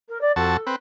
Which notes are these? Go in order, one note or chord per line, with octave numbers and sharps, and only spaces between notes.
A#4
D5
F2 F#4 A4 A5
C4 B4